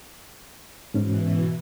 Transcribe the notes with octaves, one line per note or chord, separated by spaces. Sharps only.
G#2 B2 E3 C#4